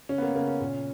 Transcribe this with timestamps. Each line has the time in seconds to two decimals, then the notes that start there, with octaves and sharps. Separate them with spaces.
0.09 C#3 C#4
0.18 B3
0.22 A#3
0.35 C#3 A#3
0.47 C#4
0.60 A#2